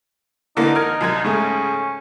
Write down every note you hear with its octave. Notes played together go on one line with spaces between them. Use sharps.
D3 E3 A#3 D#4
A#4 F6 G#6
C2 F#2 G#6
G#2 C#3 A3 C#4